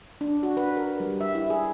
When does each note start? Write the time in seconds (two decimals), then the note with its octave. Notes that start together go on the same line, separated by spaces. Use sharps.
0.21 D4
0.43 F#4
0.57 B4
0.77 A#4
1.00 G3
1.21 E5
1.35 E4
1.50 G#4